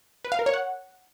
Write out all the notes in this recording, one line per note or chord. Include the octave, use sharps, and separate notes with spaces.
B4
F5
A#4
C#5
F#5